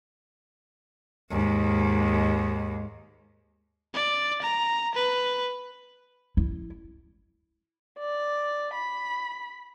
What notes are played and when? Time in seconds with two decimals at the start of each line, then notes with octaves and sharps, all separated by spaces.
1.30 D#2 G#2
3.94 D5
4.42 A#5
4.95 B4
6.37 E4
7.99 D5
8.74 B5